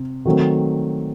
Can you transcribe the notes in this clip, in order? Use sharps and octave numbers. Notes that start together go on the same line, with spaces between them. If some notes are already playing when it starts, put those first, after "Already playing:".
Already playing: C3
D#3 F#3 A3 C4